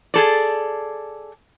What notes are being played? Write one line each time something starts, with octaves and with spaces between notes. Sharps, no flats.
G#4 A4 D5